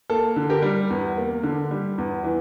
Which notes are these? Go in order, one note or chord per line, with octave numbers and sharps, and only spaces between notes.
A#3 A4
D3
G4 A#4
G3
E2
A#3
D3
G3
E2
E3